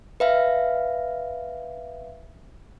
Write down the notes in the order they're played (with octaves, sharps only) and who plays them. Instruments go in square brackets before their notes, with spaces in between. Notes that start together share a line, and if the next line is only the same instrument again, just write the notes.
[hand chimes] B4 E5 F5